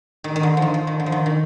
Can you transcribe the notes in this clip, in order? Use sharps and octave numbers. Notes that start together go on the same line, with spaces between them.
D#3
D#3
D3
F3
D#3
F3
D#3
D3
F3
D#3
D#3